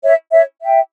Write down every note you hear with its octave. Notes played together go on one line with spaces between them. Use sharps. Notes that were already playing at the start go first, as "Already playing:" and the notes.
C#5 E5
C#5 E5
E5 G5